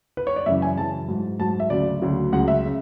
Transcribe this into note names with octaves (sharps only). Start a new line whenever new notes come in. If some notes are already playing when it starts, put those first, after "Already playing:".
B4
C#5
D5
F#2 C#3 E3 E5
G#5
F#2 C#3 E3 A5
G#2 F#3
G#2 F#3 A5
E5
D2 C#3 F#3 D5
D2 C#3 F#3
C#2 C#3 F#3 F#5
E5
C#3